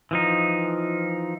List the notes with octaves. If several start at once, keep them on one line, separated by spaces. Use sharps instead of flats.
E3 F3 D#4